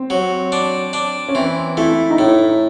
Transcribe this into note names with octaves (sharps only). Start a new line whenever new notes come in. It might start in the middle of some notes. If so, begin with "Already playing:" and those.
Already playing: C4
F#3
D4
D4
C#4
E3 C4
A3 E4
D#4
A2 E4